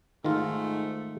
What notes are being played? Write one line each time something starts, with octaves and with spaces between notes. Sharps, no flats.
G#2 D#3 A3 F4